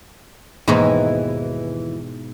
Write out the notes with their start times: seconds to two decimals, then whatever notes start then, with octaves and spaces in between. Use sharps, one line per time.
0.68 D#2 G#2 B2 E3 D#4